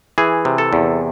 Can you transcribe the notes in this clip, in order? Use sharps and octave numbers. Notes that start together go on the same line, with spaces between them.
E3 G#4
C3
A4
E2